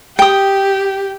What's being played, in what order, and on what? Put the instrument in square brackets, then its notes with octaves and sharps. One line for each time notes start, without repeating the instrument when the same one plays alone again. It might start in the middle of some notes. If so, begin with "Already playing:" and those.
[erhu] G4 [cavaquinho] G5 D#6